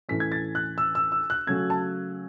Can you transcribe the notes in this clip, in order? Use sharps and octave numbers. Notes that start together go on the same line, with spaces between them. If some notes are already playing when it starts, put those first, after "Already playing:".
A2 E3 A3 C#4 B6
G#6
A6
F#6
E6
E6
E6
F#6
C#3 F#3 A3 C#4 G#6
A5